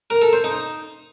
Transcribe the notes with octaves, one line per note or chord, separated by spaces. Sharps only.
A#4
A4
C5
D#4